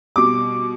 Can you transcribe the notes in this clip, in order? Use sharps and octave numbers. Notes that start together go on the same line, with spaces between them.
B2 G3 D6